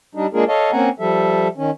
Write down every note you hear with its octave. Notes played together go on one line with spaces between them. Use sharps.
G3 D4 D#4
G#3 A#3 D4 F4 G#4 A#4
A4 C#5 D#5 F5 A5
A#3 C4 C#4 F#5 G#5 A#5
F3 G3 A4 E5
D#3 C#4